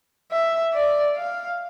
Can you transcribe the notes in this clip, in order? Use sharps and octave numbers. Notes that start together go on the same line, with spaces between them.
E5
D5
F5